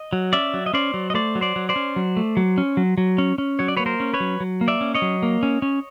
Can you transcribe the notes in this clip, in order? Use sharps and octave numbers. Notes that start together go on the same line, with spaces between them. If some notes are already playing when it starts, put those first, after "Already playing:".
Already playing: D#5
F#3
C#4 D5 E5
F#3
D#5
C#4 C5 D5
F#3
D#5
A3 C5 D5
F#3
C5 D5
F#3
C5 D5
C#4
F#3
A3
F#3
C#4
F#3
F#3
C#4
C#4
F#3 C#5
D5
A#3 B4 C#5
A#4 C5
C#4
B4 C#5
F#3
F#3
A#3
D5 E5
C#4
C#5 D#5
F#3
A#3
C#4
C#4